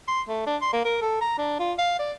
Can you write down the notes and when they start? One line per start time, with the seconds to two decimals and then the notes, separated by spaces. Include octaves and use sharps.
0.08 C6
0.28 A3
0.47 D4
0.61 C6
0.73 A#3
0.85 A#4
1.02 A4
1.21 A#5
1.38 D4
1.59 F4
1.78 F5
1.99 D5